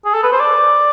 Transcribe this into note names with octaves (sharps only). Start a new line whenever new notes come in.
G#4
A4
B4
C5
D5